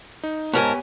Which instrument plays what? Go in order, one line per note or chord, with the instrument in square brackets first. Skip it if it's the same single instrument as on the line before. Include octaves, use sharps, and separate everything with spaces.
[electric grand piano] D#4
[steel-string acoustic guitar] G#2 A#4 A5 [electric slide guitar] B3 G4 G#5 [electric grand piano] C#5